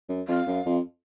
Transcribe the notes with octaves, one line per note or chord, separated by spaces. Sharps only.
F#2
F2 F5
F#2
F2